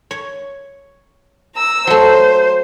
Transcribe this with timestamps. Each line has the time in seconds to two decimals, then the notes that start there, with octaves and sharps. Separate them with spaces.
0.11 C#5
1.55 A#5 E6
1.87 F#3 A3 C5